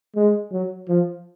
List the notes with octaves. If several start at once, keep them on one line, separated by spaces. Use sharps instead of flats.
G#3
F#3
F3